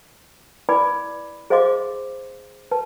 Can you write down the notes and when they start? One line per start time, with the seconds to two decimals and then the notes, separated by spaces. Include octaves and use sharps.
0.69 E4 B4 D5 G#5 B5 D6
1.50 G#4 C5 D#5 F5 C6 D6
2.71 B4 A5